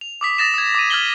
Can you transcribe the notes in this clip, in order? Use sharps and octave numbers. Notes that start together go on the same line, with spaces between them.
F7
D6 D#6 B6
D#6 A6 A#6 E7
D#6 G#6
D6 D#7
F6 G#6 A6 B6 F#7 G7